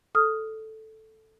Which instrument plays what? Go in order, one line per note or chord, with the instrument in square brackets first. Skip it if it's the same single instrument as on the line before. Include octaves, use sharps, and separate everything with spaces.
[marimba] A4 D#6 F6